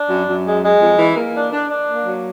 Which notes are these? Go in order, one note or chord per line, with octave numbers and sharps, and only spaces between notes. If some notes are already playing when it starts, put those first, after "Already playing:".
Already playing: D4
F#2
F#2
G#3
G#3
F2
E3
A#3
D4
D4
D4
A#3
F#3